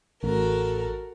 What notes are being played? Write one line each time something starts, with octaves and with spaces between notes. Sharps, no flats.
A1 F#4 A4 A#4